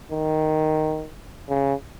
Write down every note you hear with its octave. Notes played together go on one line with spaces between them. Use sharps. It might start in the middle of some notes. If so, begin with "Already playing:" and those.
D#3
C#3